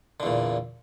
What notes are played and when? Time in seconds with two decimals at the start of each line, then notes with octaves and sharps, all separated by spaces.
0.20 D3
0.23 E2
0.26 A#2